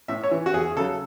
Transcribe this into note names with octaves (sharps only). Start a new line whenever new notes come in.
A2 E5
C#5
E3
F#4
E2 G#4
C#3 F#3 A4